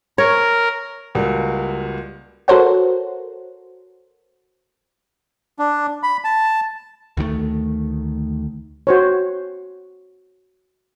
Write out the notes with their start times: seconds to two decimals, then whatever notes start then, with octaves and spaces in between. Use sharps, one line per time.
0.18 A#4 C#5
1.15 C#2 G3 A#3 F#4
2.48 F#4 A4 A#4 C5 C#5 F#5
5.59 D4
6.03 B5
6.24 A5
7.17 D2 D#3 F#3 A3
8.87 F#4 C5 C#5